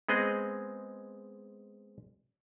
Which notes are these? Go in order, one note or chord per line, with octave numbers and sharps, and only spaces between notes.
G#3 B3 C4 G#4 D#5